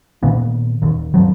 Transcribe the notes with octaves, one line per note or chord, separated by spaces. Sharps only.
A#2 D#3 A#3 B3
D#1 D#2
G2 F3 F#3